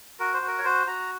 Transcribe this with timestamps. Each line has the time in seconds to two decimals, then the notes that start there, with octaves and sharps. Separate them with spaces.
0.20 F#4 A#4
0.34 C5
0.42 F#4
0.47 A#4
0.58 C#5
0.64 F#4 C5
0.87 F#4 A#5